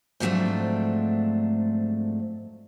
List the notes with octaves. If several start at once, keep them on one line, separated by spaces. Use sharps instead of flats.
G#2 F3 F#3 A3 C4 D4